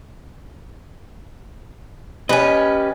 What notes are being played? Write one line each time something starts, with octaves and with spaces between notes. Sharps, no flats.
C#4 G4 B4 D#5